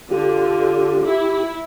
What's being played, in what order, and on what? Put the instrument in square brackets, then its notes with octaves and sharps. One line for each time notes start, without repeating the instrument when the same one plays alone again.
[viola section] D3 [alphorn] F4 [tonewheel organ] G4
[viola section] E4